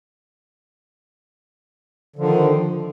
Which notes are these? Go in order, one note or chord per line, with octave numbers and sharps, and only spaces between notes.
D3 D#3 F3